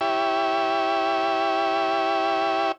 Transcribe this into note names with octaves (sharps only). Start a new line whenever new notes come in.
E4 G4 C#5 E5